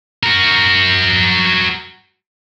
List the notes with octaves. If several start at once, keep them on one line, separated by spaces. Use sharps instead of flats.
F#4 A#4